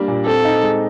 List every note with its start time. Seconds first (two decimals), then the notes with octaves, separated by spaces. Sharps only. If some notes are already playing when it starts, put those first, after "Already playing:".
Already playing: G3 A#3 D4
0.08 A#2
0.26 C4 A4
0.45 D#4
0.63 G#3